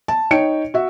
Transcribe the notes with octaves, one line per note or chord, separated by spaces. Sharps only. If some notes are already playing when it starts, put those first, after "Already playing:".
A5
D#4 C#5 G5 C#7 D7
F#4 E5